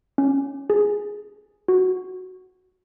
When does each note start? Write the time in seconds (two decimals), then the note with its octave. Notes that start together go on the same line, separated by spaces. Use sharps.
0.18 C#4
0.70 G#4
1.68 F#4